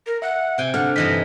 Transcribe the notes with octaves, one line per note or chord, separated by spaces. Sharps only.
A#4
E5 F#5
C3 G5 G#5
D3 F#5 F6
G2 E3 D#4 D#5 B6